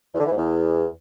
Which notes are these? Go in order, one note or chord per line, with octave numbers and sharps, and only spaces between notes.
E2
D3
E3
G#2
E2